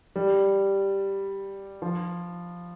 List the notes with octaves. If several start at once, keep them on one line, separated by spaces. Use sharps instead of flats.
G3
F3